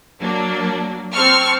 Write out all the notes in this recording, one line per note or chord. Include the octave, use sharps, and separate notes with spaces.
F#3 A#3 D4
C4 A5 C#6 F6